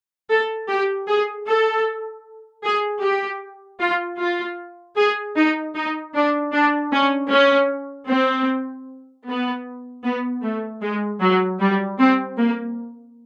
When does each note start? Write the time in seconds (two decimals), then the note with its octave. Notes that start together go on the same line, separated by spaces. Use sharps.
0.30 A4
0.69 G4
1.07 G#4
1.47 A4
2.64 G#4
3.03 G4
3.81 F4
4.20 F4
4.97 G#4
5.37 D#4
5.75 D#4
6.14 D4
6.53 D4
6.92 C#4
7.31 C#4
8.09 C4
9.26 B3
10.04 B3
10.43 A3
10.82 G#3
11.21 F#3
11.60 G3
11.98 C4
12.38 A#3